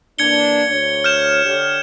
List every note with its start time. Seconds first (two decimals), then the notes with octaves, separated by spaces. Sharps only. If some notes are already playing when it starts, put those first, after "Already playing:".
0.19 E3 A#3 D4 G#6 C#7 G7
0.69 D2 C#5
1.04 F6 G6 E7
1.44 D3 G4 C#5